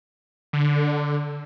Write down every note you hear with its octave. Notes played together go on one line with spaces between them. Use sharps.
D3